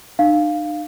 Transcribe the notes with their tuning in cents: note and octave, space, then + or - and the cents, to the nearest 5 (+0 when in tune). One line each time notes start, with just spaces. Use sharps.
D#4 -45 F5 +0